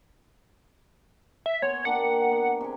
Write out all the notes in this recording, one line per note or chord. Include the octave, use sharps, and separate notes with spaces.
E5
B3 C#5 G#5 C6
A#3 D4 G4 F#5
B3
C3 G#4